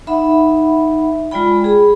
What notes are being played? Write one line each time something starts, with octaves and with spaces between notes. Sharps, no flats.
D#4 E5 F#5 B5
G#3 F4 D5 G5 B5
G#4 B5